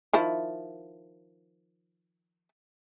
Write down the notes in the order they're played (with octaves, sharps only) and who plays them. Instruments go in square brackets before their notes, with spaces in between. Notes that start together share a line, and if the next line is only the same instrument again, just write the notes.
[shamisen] D#3 F3 E4